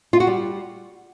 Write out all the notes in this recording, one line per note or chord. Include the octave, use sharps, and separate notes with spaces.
F4
F#4
G3